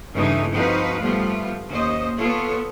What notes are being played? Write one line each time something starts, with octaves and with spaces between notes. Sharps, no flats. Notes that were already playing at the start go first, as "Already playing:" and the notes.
G2 C#3 E3 A3 D4 D#4
F3 C4 D#4 F#4 B4 F5
F3 G3 A3 B3 F4
D#2 C#4 C5 D#5
B3 F4 A4 C#5